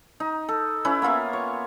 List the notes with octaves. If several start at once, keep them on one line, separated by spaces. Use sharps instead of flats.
D#4
A4
C#4 E4 B4
A#3 B3 F4 E5
C#5